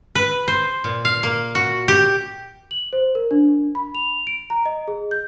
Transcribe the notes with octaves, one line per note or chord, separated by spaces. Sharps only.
B4
C5
A#2
F5
A#3
F#4
G4
F#7
C5
A#4
D4
B5
F7
D7
A#5
D#5
G#4
G6